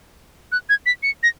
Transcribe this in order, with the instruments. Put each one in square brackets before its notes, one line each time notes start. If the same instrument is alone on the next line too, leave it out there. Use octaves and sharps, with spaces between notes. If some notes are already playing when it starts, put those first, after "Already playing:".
[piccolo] F#6
G#6
B6
C#7
A#6